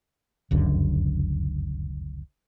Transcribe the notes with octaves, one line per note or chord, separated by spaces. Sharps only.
F1 C#2 F#2 D3